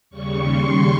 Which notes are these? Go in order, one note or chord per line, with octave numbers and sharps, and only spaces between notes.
D#2 C#3 G3 C#6
C6